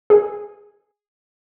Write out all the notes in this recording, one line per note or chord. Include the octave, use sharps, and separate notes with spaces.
G#4